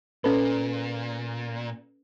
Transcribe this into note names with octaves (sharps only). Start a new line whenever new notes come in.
A#2 C#4 A4 B4